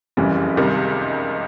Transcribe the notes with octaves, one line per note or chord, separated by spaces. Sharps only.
F#1 F2 C#3 E3 G3
C#2 C3 D#3 G3